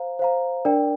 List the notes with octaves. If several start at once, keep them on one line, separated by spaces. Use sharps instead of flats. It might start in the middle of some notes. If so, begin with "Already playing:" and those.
Already playing: C5 F5 A#5
C5 F5 A#5
D4 A#4 D5 G5